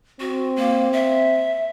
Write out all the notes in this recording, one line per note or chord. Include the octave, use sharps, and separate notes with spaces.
C4 F#4
A#3
E5